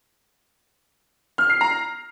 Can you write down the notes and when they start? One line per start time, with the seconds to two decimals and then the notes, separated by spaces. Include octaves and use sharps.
1.38 F6
1.50 C7
1.61 A#5